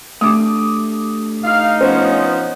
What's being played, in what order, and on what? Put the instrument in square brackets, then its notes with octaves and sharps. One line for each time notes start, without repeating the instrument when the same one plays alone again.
[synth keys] A3 D4 G4 [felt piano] D6 D#6
[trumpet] D#4 [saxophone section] F5
[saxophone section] F3 B3 C#4 [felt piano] C5